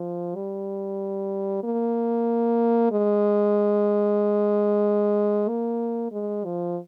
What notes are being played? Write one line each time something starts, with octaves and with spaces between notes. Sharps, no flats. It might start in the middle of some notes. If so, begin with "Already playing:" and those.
Already playing: F3
G3
A#3
G#3
A#3
G#3
F3